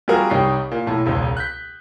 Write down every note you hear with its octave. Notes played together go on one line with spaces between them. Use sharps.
G3 C4 F4 F#4 G#4 A#4
C2 G3 D#4 C#5 G5 C7
A#2
B1 A2 A5
E1 C#2 C5
F#6 G6 B6